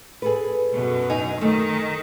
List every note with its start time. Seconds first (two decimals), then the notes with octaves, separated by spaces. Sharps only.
0.22 G#4 A4 B4
0.73 F#2 B2
1.10 D#4 G#5
1.41 D#3 A3